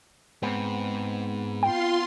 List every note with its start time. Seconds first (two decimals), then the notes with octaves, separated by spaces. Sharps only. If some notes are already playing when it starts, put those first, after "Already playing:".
0.43 G#2 B3 C4
1.63 F4 G5 C6